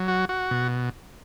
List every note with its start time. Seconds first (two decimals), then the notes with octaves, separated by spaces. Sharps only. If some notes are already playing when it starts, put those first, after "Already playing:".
Already playing: F#3
0.08 F#4
0.29 F#4
0.51 B2